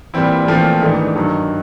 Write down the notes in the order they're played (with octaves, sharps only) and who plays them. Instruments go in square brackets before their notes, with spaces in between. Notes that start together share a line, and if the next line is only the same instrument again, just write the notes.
[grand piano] A#2 G3 C4 E4 [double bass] E3
[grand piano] A#2 F3 A3 C4 [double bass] E3
[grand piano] G#2 E3 A3 D4 [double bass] D#3
[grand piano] G2 D#3 F#3